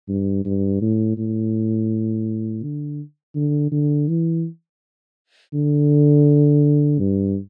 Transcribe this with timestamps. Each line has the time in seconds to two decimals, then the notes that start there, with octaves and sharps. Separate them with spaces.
0.09 G2
0.45 G2
0.81 A2
1.17 A2
2.63 D3
3.35 D3
3.72 D3
4.08 E3
5.54 D3
6.99 G2